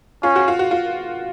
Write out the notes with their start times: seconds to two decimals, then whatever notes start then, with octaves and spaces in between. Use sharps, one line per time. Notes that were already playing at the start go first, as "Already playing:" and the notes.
0.23 C#4 F4
0.36 F#4
0.48 F4
0.59 F#4
0.71 F4